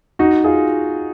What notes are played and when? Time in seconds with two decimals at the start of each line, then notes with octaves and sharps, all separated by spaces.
0.19 D#4 F#4
0.44 F4 G#4